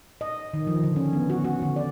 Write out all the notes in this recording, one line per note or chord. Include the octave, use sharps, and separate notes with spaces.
D#5
D#3
F3
D3
C#4
B3
F#4
F#4
D3
D5